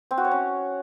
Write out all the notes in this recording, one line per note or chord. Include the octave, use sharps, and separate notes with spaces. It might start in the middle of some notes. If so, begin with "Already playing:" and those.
C4
F#4
C#5
C#4